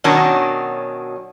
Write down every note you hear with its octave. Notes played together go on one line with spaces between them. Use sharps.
B2 D#3 F#3 C#4 D4